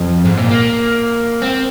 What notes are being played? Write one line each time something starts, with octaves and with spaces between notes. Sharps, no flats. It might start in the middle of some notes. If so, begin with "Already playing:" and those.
Already playing: F2
G#2
A#2
A#3
C4